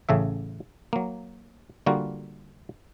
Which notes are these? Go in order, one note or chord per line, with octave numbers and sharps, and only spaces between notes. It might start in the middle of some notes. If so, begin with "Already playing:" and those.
A1 C#3 A3 E5
F#3 A#3
D3 G3 A#3 F4 F#4